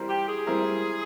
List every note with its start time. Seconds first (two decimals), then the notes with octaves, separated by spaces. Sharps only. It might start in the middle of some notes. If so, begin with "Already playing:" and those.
Already playing: G3 C4 E4 A#4
0.09 G4
0.28 G#4
0.47 G3 C4 E4 A#4